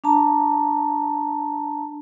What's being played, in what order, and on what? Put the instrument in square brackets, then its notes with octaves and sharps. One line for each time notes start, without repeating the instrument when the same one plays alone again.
[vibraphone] D4 A5 A#5